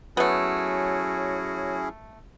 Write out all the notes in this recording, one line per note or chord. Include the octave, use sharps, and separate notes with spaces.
F#3 A3 B3 C#4 E4 G#4